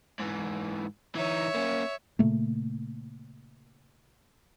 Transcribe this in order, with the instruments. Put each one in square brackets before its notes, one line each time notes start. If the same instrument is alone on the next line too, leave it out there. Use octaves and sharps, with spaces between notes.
[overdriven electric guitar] G#2 E3
[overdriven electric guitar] E3 D#4 [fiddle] C#5 E5
[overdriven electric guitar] A#3 C#4
[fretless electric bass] A#2 C#3 A3 A#3